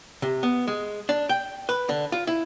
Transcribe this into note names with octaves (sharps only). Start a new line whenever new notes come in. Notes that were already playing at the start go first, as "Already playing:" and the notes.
C3
B3
G#3
D4
G5
B4
D3
F4
E4